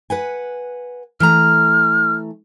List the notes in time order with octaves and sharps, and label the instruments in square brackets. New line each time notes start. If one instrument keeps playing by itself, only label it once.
[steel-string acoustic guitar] B4 F#5 G#5
[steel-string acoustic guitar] E3 A3 A#5 [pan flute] F6